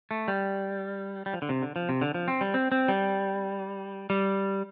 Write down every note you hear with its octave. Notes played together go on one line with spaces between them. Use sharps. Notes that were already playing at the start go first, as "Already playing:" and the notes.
A3
G3
G3
F3
D3
C3
D3
F3
C3
D3
F3
C4
G3
C4
C4
G3
G3